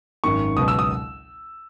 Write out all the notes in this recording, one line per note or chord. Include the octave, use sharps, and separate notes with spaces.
G#1 F#2 D#3 C#6
C#2 B2 F#3 D#6
E6
D#6